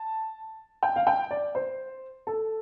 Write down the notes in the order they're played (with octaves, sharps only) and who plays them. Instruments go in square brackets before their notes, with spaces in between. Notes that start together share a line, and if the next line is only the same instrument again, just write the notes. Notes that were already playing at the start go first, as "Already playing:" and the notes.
Already playing: [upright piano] A5
G5
F5
G5
D5
C5
A4